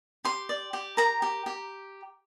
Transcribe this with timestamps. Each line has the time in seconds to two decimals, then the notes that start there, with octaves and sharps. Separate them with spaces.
0.25 G4 C6
0.49 D5
0.73 G4
0.97 A#4 A#5
1.22 G4
1.46 G4